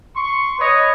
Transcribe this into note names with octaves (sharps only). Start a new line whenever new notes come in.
C6 C#6
B4 C#5 D#5